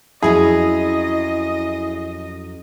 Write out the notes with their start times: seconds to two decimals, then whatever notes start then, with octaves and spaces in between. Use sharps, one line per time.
0.23 F2 F#3 C#4 E4 G#4 D#5